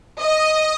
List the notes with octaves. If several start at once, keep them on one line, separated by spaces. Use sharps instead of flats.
D#5